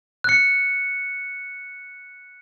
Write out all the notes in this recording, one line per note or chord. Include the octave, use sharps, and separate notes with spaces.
F#6 C#7